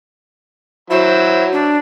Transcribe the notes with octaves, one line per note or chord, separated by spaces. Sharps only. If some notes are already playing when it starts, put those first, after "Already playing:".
F#3 E4 C5
D4